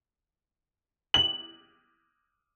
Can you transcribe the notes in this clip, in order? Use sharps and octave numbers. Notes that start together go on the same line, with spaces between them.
F#7